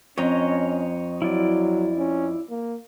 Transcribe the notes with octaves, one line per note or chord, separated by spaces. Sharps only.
F2 C#4 C#5 D#5 A#5
F#3 E4 F4 D5
C#4
A#3